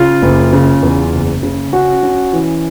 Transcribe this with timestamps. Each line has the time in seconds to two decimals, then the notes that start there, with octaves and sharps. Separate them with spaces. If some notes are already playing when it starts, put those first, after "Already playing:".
Already playing: C#3 F4
0.22 F#1
0.53 C#3
0.83 E2
1.13 F#1
1.43 C#3
1.73 C#4 F#4
2.03 C#4
2.33 E3